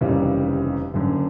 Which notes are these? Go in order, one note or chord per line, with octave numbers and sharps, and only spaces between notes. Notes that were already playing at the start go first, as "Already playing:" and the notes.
F1 D#2 C#3 E3 G3
F#1 F#2 D3